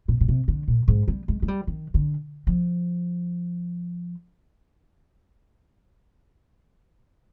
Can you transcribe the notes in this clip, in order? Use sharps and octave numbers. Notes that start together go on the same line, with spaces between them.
A#2
A#2
C3
D3
A#2
G#2
G3
G#3
G#3
G3
D#3
D3
F3